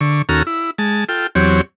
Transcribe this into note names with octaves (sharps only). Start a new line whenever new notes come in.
D3 C#6
D#2 C#4 F#4 A4 A#5 F6
E4
G#3 A5
F4 A4 G5
E2 F#3 C4 G4 C#5